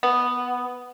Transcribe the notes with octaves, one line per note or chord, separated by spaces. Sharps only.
B3